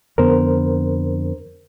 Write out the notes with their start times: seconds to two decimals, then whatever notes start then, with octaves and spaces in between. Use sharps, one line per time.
0.18 F2 D3 B3 A#4 C5